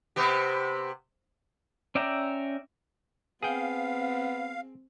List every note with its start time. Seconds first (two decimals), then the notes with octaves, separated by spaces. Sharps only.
0.16 C3 B3 G4
1.95 C#4 D5 E5 G5 A#5
3.43 B3 C4 G#4 F5 G5